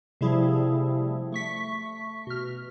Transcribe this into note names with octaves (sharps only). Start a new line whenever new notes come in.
C3 F3 G3 A3 E4 G#4
A3 C#6 B6
B2 F6